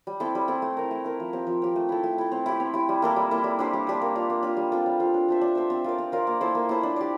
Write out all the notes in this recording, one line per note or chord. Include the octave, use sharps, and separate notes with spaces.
G3
C4 E4 A4
G3
C4 E4 A4
A3
E4 A#4
A3
E4 A#4
F3
C4 G4
F3
C4 G4
A3
E4 A4
A3
E4 A4
C4
E4 G4
C4
E4 G4
G3
A#3 E4 A4
G3
A#3 E4 A4
G3
D4 G4 C5
G3
D4 G4 C5
A#3
D4 F4
A#3
D4 F4
G3
C4 F4 A4
G3
C4 F4 A4
D4
A4 C5 E5
D4
A4 C5 E5
C4
F4 A#4 D5
C4
F4 A#4 D5
A#3
E4 A4 C5
A#3
E4 A4 C5
D4
G4 D5